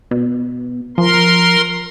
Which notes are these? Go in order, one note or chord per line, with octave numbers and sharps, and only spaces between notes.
B2
F3 A#4 C6